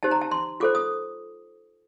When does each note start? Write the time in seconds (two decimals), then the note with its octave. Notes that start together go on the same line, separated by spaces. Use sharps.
0.03 D#4 G4 C5 A5
0.11 A#5
0.21 A5
0.31 C6
0.60 F4 A4 C5 D6
0.75 D#6